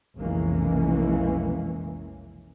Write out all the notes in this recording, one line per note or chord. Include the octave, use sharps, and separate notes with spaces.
F1 B1 E3 G#3 A#3 C#4